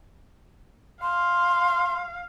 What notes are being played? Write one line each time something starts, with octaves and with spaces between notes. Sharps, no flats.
F5 C6